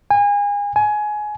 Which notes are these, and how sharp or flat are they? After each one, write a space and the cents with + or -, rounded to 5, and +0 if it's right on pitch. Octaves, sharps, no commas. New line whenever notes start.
G#5 -30
G#5 +20